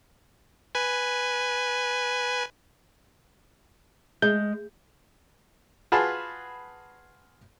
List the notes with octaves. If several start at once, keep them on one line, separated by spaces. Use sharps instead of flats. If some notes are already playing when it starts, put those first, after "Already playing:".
B4 G#5
G#3 G6
F4 F#4 G#4 B4 A5 B5